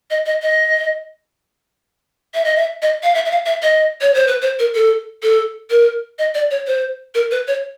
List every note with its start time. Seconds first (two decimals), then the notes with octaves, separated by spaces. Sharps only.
0.10 D#5
0.26 D#5
0.42 D#5
2.34 E5
2.45 D#5
2.56 E5
2.82 D#5
3.03 F5
3.15 E5
3.26 E5
3.31 F5
3.46 E5
3.63 D#5
4.01 C#5
4.14 C5
4.27 B4
4.42 C5
4.59 A#4
4.75 A4
5.23 A4
5.70 A#4
6.19 D#5
6.35 D5
6.51 C#5
6.67 C5
7.15 A#4
7.31 B4
7.48 C#5